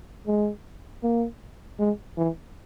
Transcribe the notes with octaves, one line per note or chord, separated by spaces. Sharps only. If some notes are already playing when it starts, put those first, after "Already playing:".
G#3
A#3
G#3
E3